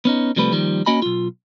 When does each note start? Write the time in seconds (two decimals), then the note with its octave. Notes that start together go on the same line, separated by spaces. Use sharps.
0.05 B3 C#4 D#4
0.36 C3 F3 G3 A3 B4
0.52 D#2 D#3 F3 G3
0.86 A#3 C#4 F#4 D#5 G#5 B5
1.02 B1 F4